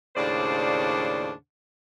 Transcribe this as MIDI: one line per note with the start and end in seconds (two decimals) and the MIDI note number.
0.16 1.31 39
0.16 1.31 45
0.16 1.31 49
0.16 1.31 62
0.16 1.31 72
0.16 1.31 74